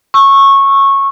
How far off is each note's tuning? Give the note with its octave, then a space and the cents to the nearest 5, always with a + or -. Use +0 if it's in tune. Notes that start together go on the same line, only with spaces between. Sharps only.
C#6 -15 E6 +0